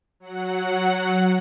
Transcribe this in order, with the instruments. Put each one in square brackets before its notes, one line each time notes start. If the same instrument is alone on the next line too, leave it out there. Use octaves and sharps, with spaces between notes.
[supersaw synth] F#3 F#5